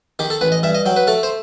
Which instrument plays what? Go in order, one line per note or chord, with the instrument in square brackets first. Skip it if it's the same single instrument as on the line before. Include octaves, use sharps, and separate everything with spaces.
[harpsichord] D#3 G4
A4
A1 B4
D#5
G2 E5
D#5
F#3 G5
B4
A3 A4
C5